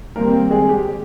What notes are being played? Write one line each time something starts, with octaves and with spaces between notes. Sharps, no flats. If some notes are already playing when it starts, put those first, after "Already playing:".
D#3 G3 A#3 C4 A#4
G#3 G#4
G4